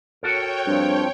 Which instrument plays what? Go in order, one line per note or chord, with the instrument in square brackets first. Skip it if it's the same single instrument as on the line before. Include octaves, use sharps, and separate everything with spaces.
[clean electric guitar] F#4 A4 A#4 [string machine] C#5 G5
[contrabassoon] G2 [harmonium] F3 C4